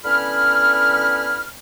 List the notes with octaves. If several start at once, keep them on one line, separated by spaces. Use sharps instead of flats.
D3 B3 C#4 E4 B5 F6